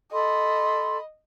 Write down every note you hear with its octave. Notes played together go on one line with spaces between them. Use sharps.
A4 D#5 B5 C6